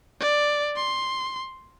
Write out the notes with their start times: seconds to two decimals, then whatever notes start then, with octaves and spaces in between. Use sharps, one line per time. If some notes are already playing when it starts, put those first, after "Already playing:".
0.21 D5
0.76 C6